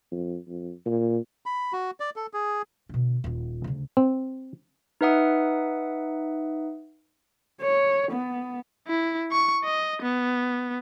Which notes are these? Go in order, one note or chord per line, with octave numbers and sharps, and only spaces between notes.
F2
F2
A#2
B5
F#4
D5
A4
G#4
B2 D3
D#1 F4
D2 C#3
C4
D#4 B4 E5 F#5 D#6
C#5
B3
E4
C#6
D#5
B3